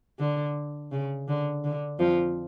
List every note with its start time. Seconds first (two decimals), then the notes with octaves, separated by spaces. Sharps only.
0.20 D3
0.92 C#3
1.28 D3
1.64 D3
1.99 F2 F3